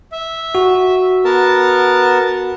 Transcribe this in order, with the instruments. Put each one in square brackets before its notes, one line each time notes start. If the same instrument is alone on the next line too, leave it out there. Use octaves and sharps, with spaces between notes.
[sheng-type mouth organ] E5
[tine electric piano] F#4
[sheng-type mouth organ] B3 A#4 A5